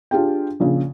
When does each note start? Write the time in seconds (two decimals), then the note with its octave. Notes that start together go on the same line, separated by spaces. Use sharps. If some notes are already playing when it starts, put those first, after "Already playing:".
0.11 D4 F4 G4 G#4 G5
0.60 A#1 A#2 C#3